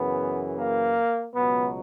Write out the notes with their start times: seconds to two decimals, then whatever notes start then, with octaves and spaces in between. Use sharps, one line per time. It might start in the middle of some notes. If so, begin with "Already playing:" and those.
Already playing: F#2 C#3 E3 B3
0.57 A#3
1.34 C#2 B2 F#3 B3